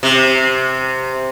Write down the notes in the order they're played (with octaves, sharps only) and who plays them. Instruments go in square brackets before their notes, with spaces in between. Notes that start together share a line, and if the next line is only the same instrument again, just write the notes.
[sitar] C3